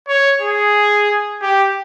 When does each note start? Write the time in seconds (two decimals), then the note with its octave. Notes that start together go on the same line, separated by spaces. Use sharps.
0.08 C#5
0.42 G#4
1.42 G4